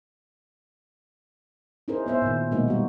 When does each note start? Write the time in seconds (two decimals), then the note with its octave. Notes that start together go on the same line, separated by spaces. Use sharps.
1.88 C#4 D#4 E4 G#4 A#4 C5
2.06 B3 C5 E5
2.22 A#2 D#3
2.51 B2 G#3 A#3 D#4 F#4
2.68 G3 F#4